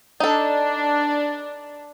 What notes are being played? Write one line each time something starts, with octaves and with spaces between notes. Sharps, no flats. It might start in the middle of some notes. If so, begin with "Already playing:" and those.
D4 D#4 A4